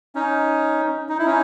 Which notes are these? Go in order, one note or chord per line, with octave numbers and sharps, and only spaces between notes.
C#4 D#4
D#4
E4
C#4 D#4